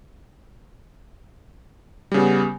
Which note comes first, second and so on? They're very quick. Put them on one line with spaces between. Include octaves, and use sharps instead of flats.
G3 C#3 B3